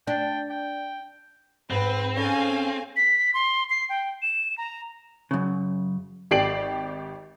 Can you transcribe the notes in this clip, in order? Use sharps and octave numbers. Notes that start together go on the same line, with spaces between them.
D4 G5
G5
G#2 C4 B4
C#4 A4 C#5 F5 G#5
B6
C6
C7
G5
E7
A#5
F#2 C#3
G#1 G4 D5 C7 D7 F#7